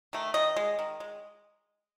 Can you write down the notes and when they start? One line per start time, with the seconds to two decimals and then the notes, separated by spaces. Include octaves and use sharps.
0.13 D#3 A3
0.34 D#3 D#5
0.56 G#3
0.79 D#3
1.00 G#3